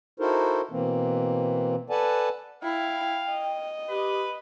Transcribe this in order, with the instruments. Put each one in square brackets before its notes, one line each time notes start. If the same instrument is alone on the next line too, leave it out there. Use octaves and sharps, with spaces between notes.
[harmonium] D#4 E4 F#4 A4 A#4 C5
B2 E3 A#3 C4
A4 B4 D5 F#5 G#5 A5
[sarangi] E4 [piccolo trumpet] F5 [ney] G5
[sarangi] D#5
[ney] G4 [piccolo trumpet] B4